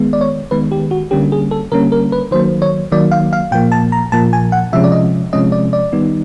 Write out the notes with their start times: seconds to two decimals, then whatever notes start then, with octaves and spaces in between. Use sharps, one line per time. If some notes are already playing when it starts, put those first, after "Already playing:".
Already playing: D#3 G#3 B3
0.13 D5
0.21 C#5
0.51 D#3 G#3 B3 B4
0.71 G4
0.91 F#4
1.11 D3 G3 A#3 C#4 G4
1.32 G#4
1.51 A4
1.72 D3 G3 A#3 C#4 A#4
1.92 A#4
2.12 B4
2.31 D#3 F#3 A#3 C5
2.62 C#5
2.91 D#3 F#3 A#3 D5
3.11 F5
3.33 F5
3.51 A#2 F3 A#3 G5
3.72 A5
3.92 A#5
4.12 A#2 F3 A#3 A5
4.33 G#5
4.52 F#5
4.73 C3 F3 G#3 C#4 E5
4.84 D5
4.92 D#5
5.33 C3 F3 G#3 C#4 D#5
5.52 D5
5.73 D5
5.92 D#3 G3 B3 D#4